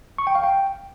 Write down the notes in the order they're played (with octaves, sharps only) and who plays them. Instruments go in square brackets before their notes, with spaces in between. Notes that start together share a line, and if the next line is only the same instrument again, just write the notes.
[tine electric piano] C#6
G5
F5
G5